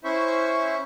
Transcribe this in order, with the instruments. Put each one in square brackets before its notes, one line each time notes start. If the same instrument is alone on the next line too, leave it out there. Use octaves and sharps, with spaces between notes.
[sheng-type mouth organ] C#4 C#6 [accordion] E4 C5 E5